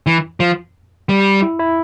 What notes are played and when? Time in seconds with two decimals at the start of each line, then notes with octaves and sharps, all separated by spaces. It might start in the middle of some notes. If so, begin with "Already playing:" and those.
0.07 E3
0.40 F3
1.09 G3
1.42 E4
1.59 E4